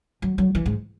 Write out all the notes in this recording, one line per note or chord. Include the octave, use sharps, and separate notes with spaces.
F#3
F#3
E3
G#2